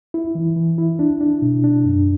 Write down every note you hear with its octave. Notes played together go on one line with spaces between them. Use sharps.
E4
E3
E3
E4
D4
D4
B2
D4
F#2